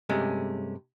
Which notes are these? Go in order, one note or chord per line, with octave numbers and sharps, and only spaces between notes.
G2 C3 G#3 A3 C#4